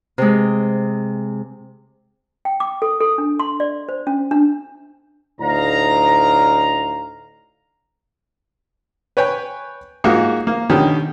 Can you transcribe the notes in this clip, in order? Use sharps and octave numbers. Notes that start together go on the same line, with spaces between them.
C3 G#3
G5
D6
A4
A4
D4
C6
D5
C5
C#4
D4
D2 A2 D#4 F5 A#5
B4 C#5 G5 G#5
G#2 A#3 F4 F#4
A#3
B2 D3 D#3 C#4 G4